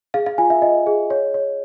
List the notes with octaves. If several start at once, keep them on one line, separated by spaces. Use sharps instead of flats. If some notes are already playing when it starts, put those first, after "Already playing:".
G#4 F5
F5
F4 G#5
E5
F4 D#5
G#4
C#5
C#5